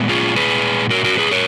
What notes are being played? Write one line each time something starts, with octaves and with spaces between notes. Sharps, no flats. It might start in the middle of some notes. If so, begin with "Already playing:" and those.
Already playing: A#2 G#3 B3
F4 G#4
G#4 B4
F#4 A#4
F#4 A#4
G#4 B4
A#4 C#5